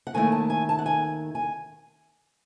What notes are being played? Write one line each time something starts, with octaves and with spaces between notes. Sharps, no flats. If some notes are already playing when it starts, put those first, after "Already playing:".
F#5
D#2 D#3 A3 E4 G#5
A5
G#5
A5
F#5
G#5
G#5